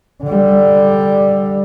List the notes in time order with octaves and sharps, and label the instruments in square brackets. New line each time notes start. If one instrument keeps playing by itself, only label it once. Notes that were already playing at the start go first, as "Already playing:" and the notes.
[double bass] D3 G3